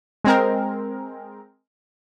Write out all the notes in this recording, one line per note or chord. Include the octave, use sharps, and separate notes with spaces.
G#3 C4 A#4